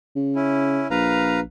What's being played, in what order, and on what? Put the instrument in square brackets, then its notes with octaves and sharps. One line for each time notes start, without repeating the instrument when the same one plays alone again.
[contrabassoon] C#3
[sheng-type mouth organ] C#4 E4
[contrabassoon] A#1 [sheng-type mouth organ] B4 F5 A#5